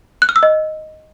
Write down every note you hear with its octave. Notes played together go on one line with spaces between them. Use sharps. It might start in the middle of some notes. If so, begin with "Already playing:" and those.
F#6
F6
E6
D#5